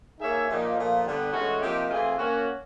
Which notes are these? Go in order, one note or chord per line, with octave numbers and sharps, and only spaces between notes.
A#3 D#4 G#4 C#5 E5
A#2 F3 A#3 D#4 G4
A#2 F3 A3
D3 G3 B3
A2 E3 G#3 C#4 F#4
C3 F3 A#3 D#4 G4
E3 A3 C4 F4 G#4
A#3 C#4 F#4